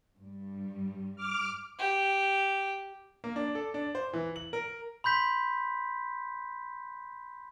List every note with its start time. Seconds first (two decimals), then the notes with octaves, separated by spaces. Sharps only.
0.19 G2 G3
1.16 D6 F6
1.79 G4
3.24 A#3
3.36 D4
3.55 A4
3.74 D4
3.95 C5
4.13 E3
4.36 F#7
4.53 A#4
5.04 B5 C6 G6 B6